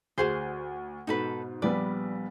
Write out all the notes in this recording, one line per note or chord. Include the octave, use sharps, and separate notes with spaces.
D2 F#4 G#4 C5
G#2 B2 D#4 A4 B4
A#1 G3 B3 B4 D5